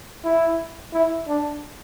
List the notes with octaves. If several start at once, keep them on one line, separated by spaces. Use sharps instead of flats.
E4
E4
D4